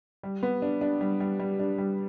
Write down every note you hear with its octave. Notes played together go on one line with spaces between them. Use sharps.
G3
B3
D4
D4
G3
G3
G3
D4
G3